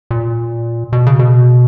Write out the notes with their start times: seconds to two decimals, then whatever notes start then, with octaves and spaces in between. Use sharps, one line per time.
0.11 A#2
0.93 B2
1.06 C#3
1.19 B2